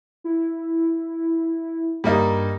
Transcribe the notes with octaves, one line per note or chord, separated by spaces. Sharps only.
E4
G2 G3 A#3 D#4